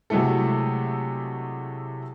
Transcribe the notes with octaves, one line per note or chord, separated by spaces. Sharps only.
C3 F#3 G#3 A3 E4 A4